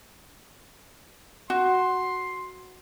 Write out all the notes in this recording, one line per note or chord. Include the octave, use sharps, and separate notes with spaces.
F#4 C6